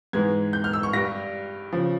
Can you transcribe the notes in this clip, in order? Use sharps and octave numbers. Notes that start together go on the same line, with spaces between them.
G#2 E3 G#3 G#6
G6
F6
E6
C#6
G2 G3 A#6
C#3 F3